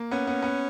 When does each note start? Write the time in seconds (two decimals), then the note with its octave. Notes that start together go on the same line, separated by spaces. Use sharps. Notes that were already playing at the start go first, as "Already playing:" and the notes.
Already playing: A#3
0.12 B3 C#4
0.27 B3
0.42 B3